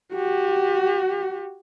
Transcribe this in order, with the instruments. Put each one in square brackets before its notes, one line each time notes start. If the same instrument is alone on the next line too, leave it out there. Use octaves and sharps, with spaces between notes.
[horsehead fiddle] F#4 G4